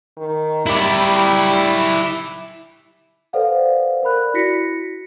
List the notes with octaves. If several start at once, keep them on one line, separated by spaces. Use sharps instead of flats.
D#3
G3 E4 D5
A4 B4 C5 D5 F5 F#5
A#4 D5 B5 F#6
E4 F#4 A#6 B6 C#7